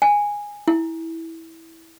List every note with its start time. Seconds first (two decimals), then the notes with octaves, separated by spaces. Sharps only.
0.02 G#5
0.68 E4